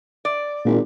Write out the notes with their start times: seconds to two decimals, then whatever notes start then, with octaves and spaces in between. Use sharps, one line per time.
0.25 D5
0.65 G#1 A#2